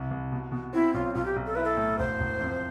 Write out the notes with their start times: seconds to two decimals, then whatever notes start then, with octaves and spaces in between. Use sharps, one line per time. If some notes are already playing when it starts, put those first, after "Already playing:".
Already playing: C2
0.11 C2
0.32 B2
0.52 B2
0.73 C4 E4
0.93 B1 F4
1.15 B1 F4
1.25 G4
1.36 B1
1.46 A4
1.55 E4 B4
1.64 A4
1.77 A2
1.99 E1 C5
2.20 E1
2.41 F2